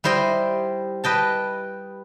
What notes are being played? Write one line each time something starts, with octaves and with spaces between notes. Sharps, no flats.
G3 E4 C5 D#5 G5
B4 D#5 G5 A5